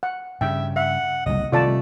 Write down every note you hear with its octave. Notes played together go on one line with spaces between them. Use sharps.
F#5
G2 C#3 E5 G5
E5 F#5
F#1 C2 D#5
C3 D#3 G3 A3 F4 D5 A5